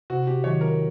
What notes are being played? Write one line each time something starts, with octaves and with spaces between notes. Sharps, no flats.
C3 F#4
G4
D#3 F#3 C#5
A#4